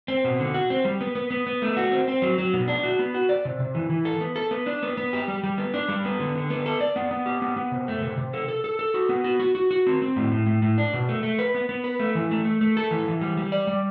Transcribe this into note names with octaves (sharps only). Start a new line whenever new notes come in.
C4
B2
D3
F#4
C4
G3
B3
B3
B3
B3
A3
F#4
C4
C4
F#3
F#3
B2
D4
F#4
B3
F#4
D5
C3
C3
E3
E3
A4
B3
A4
B3
D4
B3
B3
G4
G3
G3
B3
D4
G3
B3
D3
D3
B3
A4
D5
B3
B3
G4
B3
B3
C3
A3
C3
C3
A4
A4
A4
A4
F#4
B3
F#4
F#4
F#4
F#4
C4
C4
A2
A2
A2
A2
D4
B2
A3
A3
B4
B3
B3
B4
A3
E3
A3
A3
A3
A4
E3
E3
G3
G3
D5
G3